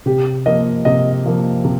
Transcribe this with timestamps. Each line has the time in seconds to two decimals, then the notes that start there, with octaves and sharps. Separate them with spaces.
0.06 C3 G4
0.46 F3 A#3 D#5
0.85 C3 D#5
1.26 F3 A#3
1.65 C3